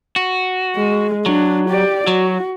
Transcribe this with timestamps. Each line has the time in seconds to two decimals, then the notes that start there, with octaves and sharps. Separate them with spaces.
0.16 F#4
0.76 G#3
1.26 F#3 D4
1.69 G4 D5
2.07 F#3 F#4